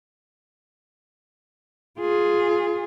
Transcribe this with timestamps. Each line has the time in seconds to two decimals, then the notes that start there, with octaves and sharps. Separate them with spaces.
1.99 F4 G#4